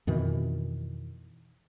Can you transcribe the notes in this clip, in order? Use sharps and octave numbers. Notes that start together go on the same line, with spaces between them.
F2 B2 D#3 E3